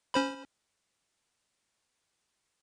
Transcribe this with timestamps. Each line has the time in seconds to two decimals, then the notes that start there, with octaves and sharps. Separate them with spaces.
0.14 C#4 C5 B5